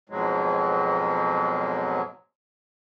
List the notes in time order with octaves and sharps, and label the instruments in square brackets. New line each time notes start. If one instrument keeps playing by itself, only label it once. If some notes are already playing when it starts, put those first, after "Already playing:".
[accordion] F2 G#2 B2 F#3 G#3